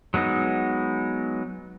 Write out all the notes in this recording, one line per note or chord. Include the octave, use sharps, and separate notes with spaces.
F#3 G#3 B3 D#4